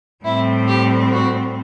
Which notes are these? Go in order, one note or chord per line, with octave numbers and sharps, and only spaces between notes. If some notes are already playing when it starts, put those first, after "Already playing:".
A2 G3 C4 E4
G4
F#4